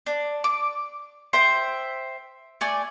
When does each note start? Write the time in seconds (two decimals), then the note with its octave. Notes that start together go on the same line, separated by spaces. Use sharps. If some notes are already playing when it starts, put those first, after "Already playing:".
0.06 D4
0.44 D6
1.33 C5 E5 G5
2.61 A3 D5 G#5